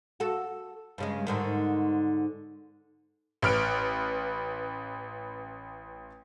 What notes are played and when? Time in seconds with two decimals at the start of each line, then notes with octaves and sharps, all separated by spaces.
0.20 F#4 A4
0.98 G2 C#3 G#3
1.27 G#2 D3 D#3
3.42 A1 B4 F6 D7